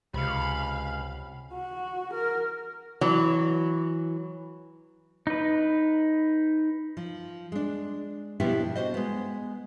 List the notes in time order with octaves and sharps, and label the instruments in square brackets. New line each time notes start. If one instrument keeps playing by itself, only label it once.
[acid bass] C#2 [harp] C3 C#7 [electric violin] F5 B5
[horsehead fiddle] F#4
A#4
[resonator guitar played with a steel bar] E3 F#3
[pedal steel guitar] D#4 B4
[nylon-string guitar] F3
G#3 D4
B2 F3 B3 D4 E4 G4
D4 D#4 F#4 C5 D#5
G#3 B3